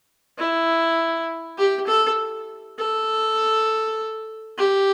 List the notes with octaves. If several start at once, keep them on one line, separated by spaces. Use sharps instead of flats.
E4
G4
A4
A4
G4